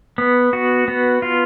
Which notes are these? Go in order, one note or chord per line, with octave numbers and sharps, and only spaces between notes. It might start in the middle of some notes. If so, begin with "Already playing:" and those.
B3
F#4
B3
F4